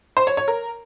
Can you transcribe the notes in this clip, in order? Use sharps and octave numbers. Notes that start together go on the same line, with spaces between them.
C5
C#5
C#5
A#4